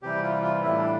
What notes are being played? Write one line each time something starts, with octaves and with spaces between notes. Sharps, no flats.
C3 E3 G3 G4
F4
F4
A2 E3 G3 E4
D4